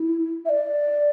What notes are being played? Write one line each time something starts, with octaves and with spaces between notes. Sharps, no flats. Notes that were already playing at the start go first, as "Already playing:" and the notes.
Already playing: E4
E5
D5